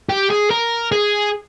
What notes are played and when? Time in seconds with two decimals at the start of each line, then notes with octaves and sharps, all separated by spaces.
0.09 G4
0.30 G#4
0.50 A#4
0.92 G#4